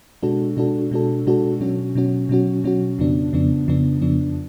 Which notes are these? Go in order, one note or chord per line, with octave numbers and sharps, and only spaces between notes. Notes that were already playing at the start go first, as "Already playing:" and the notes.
B2 G#3 D4 F#4 A4
B2 G#3 D4 F#4 A4
B2 G#3 D4 F#4 A4
B2 G#3 D4 F#4 A4
B2 F#3 C#4 F#4
B2 F#3 C#4 F#4
B2 F#3 C#4 F#4
B2 F#3 C#4 F#4
F2 C#3 F3 B3 D4
F2 C#3 F3 B3 D4
F2 C#3 F3 B3 D4
F2 C#3 F3 B3 D4